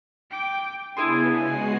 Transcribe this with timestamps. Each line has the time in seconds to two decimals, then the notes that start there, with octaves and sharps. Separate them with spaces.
0.31 G5 D6
0.97 C#3 B3 D4 E4 G#4 C6
1.36 G#3 F#4 G#5 C7